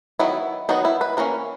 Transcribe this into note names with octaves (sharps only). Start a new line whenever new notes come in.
D#3 F#3 B3 E4
D#3 F#3 B3 D#4
E4
B4
E3 A#3 C#4 A#4